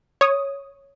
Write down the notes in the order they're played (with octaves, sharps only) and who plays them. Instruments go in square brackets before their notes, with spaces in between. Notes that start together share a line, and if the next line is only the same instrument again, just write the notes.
[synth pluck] C#5 D#6